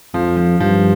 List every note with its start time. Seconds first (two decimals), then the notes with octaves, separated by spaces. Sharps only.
0.14 F2 F3
0.37 F3
0.60 G2 F3